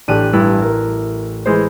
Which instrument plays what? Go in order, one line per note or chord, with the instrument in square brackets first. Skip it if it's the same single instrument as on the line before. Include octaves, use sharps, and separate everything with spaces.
[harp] A1 F#6 D#7 [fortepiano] D4 G4 A4
[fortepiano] G2 [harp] E4
[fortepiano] A#4
E3 G#3 C5